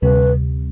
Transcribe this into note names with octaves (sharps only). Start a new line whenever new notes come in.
D2 C3 G3 B4